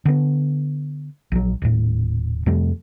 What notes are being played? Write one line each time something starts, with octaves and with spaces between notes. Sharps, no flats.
D3 B3
A#1 F#3
D#1 A2
F2 C3 G3 A3